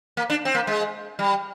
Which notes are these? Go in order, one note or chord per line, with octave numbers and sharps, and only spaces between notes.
A#3
D4
C4
A#3
G#3
G3